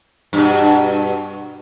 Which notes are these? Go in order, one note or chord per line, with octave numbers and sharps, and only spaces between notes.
G2 B2